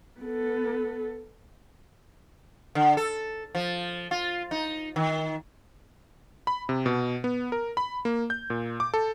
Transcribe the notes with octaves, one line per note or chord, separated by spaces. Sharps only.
B3 A4
D3
A4
F3
F4
D#4
D#3
B5
C3
B2
B3
A#4
B5
A#3
G6
A#2
D6
A4